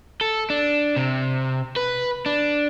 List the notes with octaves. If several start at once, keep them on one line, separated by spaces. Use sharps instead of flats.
A4
D4
C3
B4
D4